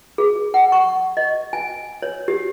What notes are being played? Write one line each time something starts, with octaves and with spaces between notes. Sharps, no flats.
G#4
F#5
C#6
D#5
G#5
C#5
G4